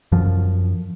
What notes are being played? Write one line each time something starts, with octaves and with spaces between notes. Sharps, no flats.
F#2 F3